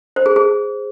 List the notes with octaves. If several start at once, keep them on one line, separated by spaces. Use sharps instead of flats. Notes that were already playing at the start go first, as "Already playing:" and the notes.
C5
G#4
G#4